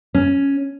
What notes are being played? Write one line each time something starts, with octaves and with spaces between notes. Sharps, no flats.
C#4